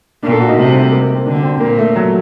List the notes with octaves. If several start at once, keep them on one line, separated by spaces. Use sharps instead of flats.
A#2 D4
A4
F#4
D#4
C3 A3
G3
A3
A#3
A#3
C4
D3 D4
C4
A#2 A#3
A3
F#3